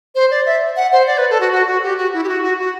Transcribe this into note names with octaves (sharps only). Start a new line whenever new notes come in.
C5
D5
E5
F#5
C5
D5
B4
A4
F#4
F#4
F#4
G4
F#4
E4
G4
F#4
F#4
F#4